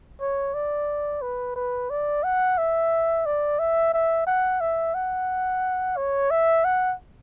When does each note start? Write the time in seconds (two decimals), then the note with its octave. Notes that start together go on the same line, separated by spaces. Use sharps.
0.21 C#5
0.54 D5
1.22 B4
1.56 B4
1.90 D5
2.24 F#5
2.58 E5
3.26 D5
3.59 E5
3.94 E5
4.27 F#5
4.61 E5
4.95 F#5
5.97 C#5
6.31 E5
6.65 F#5